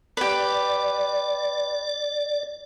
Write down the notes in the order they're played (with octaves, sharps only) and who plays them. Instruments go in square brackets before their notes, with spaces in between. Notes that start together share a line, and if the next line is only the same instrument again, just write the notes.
[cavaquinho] G4 B4 [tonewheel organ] D5